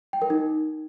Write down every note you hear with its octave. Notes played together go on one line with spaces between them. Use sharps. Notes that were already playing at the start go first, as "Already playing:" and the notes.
G5
A#4
D#4